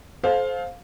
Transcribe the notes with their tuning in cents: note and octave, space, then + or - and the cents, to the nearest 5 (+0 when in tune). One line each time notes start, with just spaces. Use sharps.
A4 -35 C5 +0 F5 +15